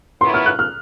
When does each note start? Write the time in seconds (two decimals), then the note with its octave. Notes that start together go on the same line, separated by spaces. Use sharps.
0.21 A2 F#3 B3 E4 C6
0.34 F6
0.46 F#6
0.59 F6